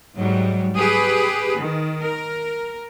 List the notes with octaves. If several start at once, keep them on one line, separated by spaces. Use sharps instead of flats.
G#2 F#3 G3
G4 G#4 B4
D#3
A#4